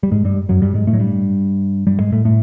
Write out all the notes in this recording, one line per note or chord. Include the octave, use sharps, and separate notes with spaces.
G3
G#2 G#3
G2 G3
F#2 F#3
G2 G3
G#2 G#3
A2 A3
F#3
G2 G3
G2 G3
G#2 G#3
A2 A3
A2 A3